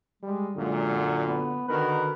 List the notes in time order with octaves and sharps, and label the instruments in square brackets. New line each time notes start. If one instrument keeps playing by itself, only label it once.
[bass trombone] G3 [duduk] G#3
[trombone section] F#2 A#2 [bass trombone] D3 [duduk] G#3
[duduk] B3
[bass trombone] D3 [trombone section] D#3 F#4 A#4 [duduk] B4